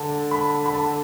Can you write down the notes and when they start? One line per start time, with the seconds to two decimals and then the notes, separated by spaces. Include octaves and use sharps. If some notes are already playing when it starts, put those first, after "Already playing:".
Already playing: D3 A5
0.31 B5
0.66 B5
0.74 A5